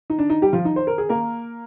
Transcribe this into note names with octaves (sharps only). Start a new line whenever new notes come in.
D#4
D4
D#4
G3 G4
F3 F4
D#4
C5
A#4
G#4
A#3 A#4